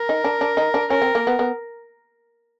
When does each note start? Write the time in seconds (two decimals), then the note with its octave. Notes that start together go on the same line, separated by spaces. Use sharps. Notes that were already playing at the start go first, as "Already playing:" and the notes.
Already playing: A#4
0.09 D#4
0.24 D4
0.41 D4
0.57 D#4
0.74 D4
0.90 C#4 A#4
1.02 C4
1.15 A#3
1.27 B3
1.39 B3